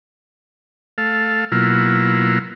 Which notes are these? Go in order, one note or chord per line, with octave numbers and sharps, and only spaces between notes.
A3 A4 F5
B2 F#3 A#3 E4 F4